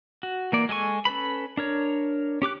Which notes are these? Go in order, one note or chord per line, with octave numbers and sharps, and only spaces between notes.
F#4
E3 A#3 D5
G#3 A4 G#5 C#6
C#4 A4 B4 B5
D4 A#4 C#5
C#4 G4 D6 F#6